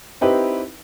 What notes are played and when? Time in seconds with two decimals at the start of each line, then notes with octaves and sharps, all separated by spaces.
0.21 C4 D#4 E4 G4 B4